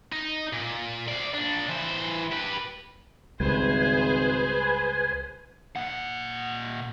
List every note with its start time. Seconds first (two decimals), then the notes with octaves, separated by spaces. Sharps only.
0.12 D#4
0.53 A#2
1.08 C5 D5
1.34 A#2 D4
1.69 E3 C5
2.32 G4 B4
3.40 G#1 C#2 G3 G#3 G#4 B4 C5 G#5
5.76 A#2 F#5